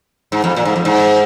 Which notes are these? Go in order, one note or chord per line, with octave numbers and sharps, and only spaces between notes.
G#2
F2
A#2
G#2
F2
G#2